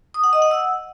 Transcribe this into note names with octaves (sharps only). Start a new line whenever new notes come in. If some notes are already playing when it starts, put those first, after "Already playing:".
D#6
F#5
D#5
F#5
E6